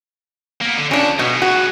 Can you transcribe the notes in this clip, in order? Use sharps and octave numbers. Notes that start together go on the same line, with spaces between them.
A#3 B3
D3
F2 C#4 D4
B2 G#3 B3
F#4